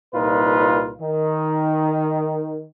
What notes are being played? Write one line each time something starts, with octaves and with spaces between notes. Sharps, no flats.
C2 A#2 D#4 F4 B4
D#3